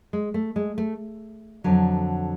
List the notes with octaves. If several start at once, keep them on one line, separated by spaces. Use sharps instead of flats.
G#3
A3
G#3
A3
F2 D3 F#3